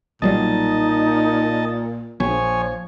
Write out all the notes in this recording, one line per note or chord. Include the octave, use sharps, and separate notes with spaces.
B1 A#2 F#3 G3 D#4 D#5 A5
A#1 F3 C#5 G#5